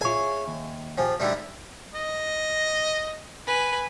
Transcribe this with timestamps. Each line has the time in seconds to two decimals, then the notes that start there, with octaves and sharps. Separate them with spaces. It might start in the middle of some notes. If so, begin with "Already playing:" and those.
0.01 F4 G#4 C#5 E5 G#5
0.48 D#2
0.98 F3 G4 G#4 G#5
1.20 D3 G3 A3 D#4 E5
1.95 D#5
3.47 B4 G#5